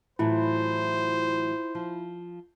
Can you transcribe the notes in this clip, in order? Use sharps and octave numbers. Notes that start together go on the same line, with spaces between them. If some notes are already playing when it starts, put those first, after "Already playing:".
A2 E3 F#3 E4 F4 C5
F3